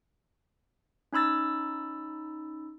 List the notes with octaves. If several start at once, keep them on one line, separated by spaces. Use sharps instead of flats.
C#4 D#4 B5 E6 A6